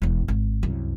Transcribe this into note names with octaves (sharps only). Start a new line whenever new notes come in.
E1 E2
G#1
C2 F#2